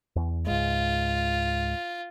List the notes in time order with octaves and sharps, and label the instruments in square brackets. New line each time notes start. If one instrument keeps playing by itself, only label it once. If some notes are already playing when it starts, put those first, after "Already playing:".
[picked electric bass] E2
[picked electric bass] C#2 G#2 G#3 [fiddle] F4